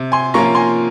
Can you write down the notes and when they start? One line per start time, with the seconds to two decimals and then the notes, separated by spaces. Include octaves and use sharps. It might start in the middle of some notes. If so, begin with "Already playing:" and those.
Already playing: C3
0.12 G#5 C6
0.34 F3 A#3 C#4 F4 A#5 C#6
0.55 G#5 C6